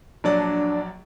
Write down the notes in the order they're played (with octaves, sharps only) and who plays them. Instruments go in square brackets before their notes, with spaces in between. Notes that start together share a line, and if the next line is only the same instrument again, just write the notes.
[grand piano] A#1 F#3 D5 [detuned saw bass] D4